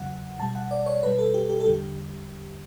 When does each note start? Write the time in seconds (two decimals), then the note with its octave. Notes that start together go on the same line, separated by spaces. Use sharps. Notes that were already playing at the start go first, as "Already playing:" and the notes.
Already playing: E2 C#3 F#3 F#5
0.39 B2 G3 A5
0.55 F#5
0.71 D5
0.86 C#5
1.03 B2 G3 B4
1.18 A4
1.34 G4
1.50 G4
1.60 A4
1.66 E2 D3 G3 G4